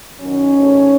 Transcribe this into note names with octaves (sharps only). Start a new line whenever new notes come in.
F#2 D#3 F#3 C#4
G#2 D#3 A3